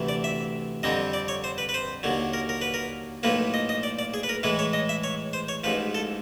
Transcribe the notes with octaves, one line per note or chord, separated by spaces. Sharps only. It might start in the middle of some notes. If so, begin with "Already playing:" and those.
Already playing: D2 C3 E3 A3
D5
E5
F2 D3 G3 C4 D#5
D5
C#5
C5
B4
B4
C5
D#2 D3 F#3
A#4
A#4
B4
A#4
B1 A2 F3 A#3 B4
D#5
D#5
D5
D5
G#4
B4
A#4
A2 E3 G#3 B4
C#5
D#5
E5
C#5
C5
C#5
A1 G#2 F3 B4
A4